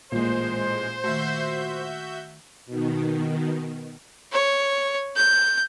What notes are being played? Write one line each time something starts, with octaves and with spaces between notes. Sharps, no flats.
A1 A#2 G#3 C5
D#3 A3 F#4 E5 G6
B2 D#3
C#5
G6